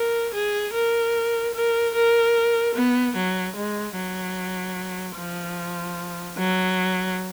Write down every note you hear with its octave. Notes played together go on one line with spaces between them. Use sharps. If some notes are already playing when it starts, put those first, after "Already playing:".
Already playing: A#4
G#4
A#4
A#4
A#4
B3
F#3
G#3
F#3
F3
F#3